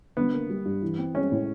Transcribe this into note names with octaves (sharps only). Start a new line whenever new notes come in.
D3 B3
A#3
G3
G2
E3
C4
G#3 C#4
A2